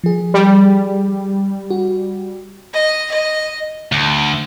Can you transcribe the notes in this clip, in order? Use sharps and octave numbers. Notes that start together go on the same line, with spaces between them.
F3 G#4
G3
F#4
D#5
D#5
D2